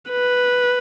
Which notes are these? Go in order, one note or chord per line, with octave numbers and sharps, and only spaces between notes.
B4